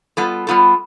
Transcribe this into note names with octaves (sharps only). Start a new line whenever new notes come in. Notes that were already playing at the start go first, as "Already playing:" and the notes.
G3 B3 F4 A4
G3 B3 F4 A4